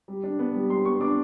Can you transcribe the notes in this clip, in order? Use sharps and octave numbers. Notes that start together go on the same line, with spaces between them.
G3
D4
B3
G3
G3 C6
B3 C#6
D4 D6